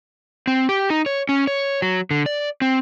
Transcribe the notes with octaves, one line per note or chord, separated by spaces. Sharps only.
C4
G4
D#4
C#5
C#4
C#5
F#3
D3
D5
C4